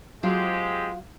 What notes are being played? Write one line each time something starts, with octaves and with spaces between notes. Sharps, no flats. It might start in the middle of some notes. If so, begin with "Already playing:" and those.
F#3 G#3 C4 F4 G4 F5